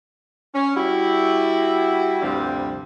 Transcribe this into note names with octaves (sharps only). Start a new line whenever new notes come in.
C#4
G3 E4 F#4
D2 G2 C3 F3 G3 C4